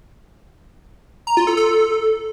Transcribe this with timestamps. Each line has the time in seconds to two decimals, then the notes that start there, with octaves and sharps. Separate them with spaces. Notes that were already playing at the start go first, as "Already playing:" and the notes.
1.27 A#5
1.37 F4
1.47 A4
1.57 A4